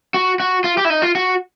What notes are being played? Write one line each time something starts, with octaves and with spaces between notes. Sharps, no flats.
F#4
F#4
F4
G4
E4
D#4
F4
F#4